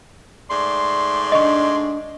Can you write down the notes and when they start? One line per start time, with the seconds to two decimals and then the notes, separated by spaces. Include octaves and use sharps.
0.50 G#2 A3 D5 C6
1.32 D4 D#5 C#6